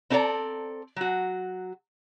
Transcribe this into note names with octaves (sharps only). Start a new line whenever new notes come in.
C4 D#4 A4 A#4 D5 A#5
F#3 F#4